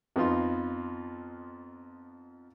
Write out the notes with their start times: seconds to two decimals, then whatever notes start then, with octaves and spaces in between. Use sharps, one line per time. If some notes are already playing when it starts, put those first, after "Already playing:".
0.16 F2 B3 D#4 F4 C6